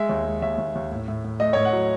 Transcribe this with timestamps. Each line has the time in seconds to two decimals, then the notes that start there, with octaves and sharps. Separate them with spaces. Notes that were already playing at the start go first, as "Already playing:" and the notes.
Already playing: G#3 E5
0.09 D#2
0.25 G#3
0.42 D#2 E5
0.58 D#2
0.75 D#2
0.91 A2
1.08 A2
1.24 A2
1.40 A3 D#5
1.53 A2 C#5
1.65 F#5
1.73 F#3